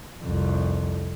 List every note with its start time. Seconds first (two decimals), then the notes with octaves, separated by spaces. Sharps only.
0.22 C2 F2